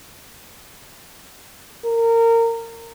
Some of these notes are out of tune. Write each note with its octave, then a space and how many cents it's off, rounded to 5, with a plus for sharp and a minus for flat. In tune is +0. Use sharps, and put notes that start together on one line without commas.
A#4 -20